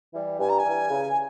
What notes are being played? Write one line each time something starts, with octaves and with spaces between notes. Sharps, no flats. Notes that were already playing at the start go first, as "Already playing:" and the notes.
E3 G3
G2 G#5
A#5
G#5
E3 G3
C#3